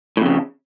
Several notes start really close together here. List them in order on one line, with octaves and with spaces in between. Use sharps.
A2 F2 C#3